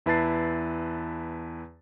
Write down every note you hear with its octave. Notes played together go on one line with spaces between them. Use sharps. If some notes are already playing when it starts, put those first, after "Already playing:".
E2 E4 B4 A5 A6 C7